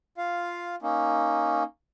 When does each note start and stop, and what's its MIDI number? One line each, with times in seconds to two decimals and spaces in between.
0.17 0.75 65
0.17 0.75 77
0.82 1.63 58
0.82 1.63 61
0.82 1.63 63